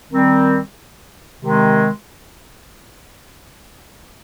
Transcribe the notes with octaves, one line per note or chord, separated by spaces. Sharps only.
D#3 G3 C4
C3 D#3 G#3 C4